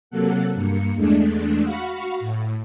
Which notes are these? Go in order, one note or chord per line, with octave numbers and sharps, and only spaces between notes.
C3 F#3 A#3 A4 F#5
G2 A#3 C#7
E2 G#3 A3 D4
F#4 F5 F#5 B5 C#6
A2